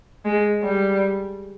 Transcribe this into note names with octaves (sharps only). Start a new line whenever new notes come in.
G#3
G3